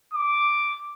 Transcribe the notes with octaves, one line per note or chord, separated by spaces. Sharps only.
D6